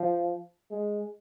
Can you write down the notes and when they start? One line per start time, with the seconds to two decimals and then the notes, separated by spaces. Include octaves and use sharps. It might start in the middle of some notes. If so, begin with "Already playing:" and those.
Already playing: F3
0.71 G#3